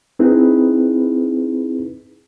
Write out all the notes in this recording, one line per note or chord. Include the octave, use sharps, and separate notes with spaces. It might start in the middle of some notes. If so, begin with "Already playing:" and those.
C4 D#4 E4 G#4 B4